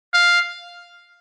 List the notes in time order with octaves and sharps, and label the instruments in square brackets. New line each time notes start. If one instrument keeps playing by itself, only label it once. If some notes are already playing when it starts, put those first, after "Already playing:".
[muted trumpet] F5